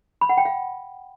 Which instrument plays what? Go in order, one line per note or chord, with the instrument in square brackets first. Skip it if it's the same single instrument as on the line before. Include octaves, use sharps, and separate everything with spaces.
[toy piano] B5
F#5
G5
F5